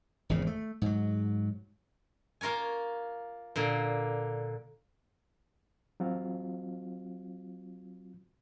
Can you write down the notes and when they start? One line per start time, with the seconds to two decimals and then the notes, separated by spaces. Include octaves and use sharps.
0.29 G#1 E2 C#3
0.47 A3
0.82 G#2 F#3
2.41 A#3 F4 A#4 C#5 G#5
3.56 A#2 D3 A#3
6.00 F#3 C4 F4 F#4